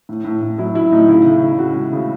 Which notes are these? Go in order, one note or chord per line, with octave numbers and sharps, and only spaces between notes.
A2
A2
A2
F#3 E4
F#3 E4
A2 D#4
C#3 E4
C#3
C#3
C#3 F#4
G#3
C#3